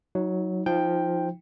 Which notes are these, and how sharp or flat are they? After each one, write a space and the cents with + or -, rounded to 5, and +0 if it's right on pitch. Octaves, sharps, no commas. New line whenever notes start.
F#3 +0 D#4 +40
F3 +0 D#4 +25 G5 +5